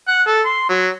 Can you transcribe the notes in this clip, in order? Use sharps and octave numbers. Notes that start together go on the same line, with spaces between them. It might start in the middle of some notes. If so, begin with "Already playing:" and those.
F#5
A4
C6
F#3